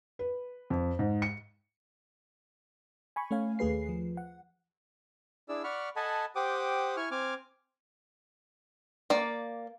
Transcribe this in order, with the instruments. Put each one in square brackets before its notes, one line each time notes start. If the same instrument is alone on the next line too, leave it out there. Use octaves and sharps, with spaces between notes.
[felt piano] B4
F2
G#2
C#7
[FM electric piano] G#5 B5 C#6
A3 C#4 C#5 F5 G#5
D#2 A3 G#4 B4 C7
F3
F#5
[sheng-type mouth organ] D4 E4 G#4 D5 E6
D5 F#5 B5 C#6 F6
A4 D#5 F#5 G#5 A5 B5
G4 C5 F#5 G5 D6 D#6
E4 G#5 C#6 F6
C4 G#5 D6 F6
[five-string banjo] A#3 D5